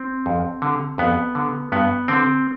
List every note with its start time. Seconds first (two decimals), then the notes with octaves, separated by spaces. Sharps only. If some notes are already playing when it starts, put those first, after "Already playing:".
Already playing: C4
0.26 F2
0.62 D3
0.98 F2 B3
1.35 D3
1.72 G2 B3
2.08 D3 C4